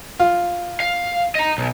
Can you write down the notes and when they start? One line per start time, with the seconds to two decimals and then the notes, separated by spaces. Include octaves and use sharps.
0.19 F4
0.80 F5
1.35 D#5 A#5
1.58 B1